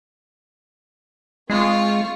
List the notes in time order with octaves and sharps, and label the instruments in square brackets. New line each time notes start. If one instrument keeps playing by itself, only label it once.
[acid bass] G#3 [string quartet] C4 F4 C#6